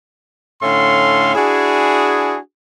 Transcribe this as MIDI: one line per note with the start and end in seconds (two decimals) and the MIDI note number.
0.62 1.34 45
0.62 1.34 50
0.62 1.34 61
0.62 1.34 69
0.62 1.34 77
0.62 1.34 84
1.35 2.36 62
1.35 2.36 64
1.35 2.36 66
1.35 2.36 68